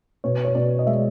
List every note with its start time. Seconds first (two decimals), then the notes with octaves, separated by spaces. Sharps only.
0.24 B2 C#5
0.45 C#5
0.55 B2 D5
0.79 D#5
0.87 G#3 E5